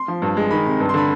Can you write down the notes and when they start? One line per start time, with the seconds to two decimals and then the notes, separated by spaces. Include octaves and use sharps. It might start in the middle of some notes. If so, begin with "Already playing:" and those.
Already playing: C6
0.08 F3
0.22 G2
0.37 G#3
0.51 D#3 B5
0.66 C3
0.80 G2
0.89 C6
0.94 D3 B5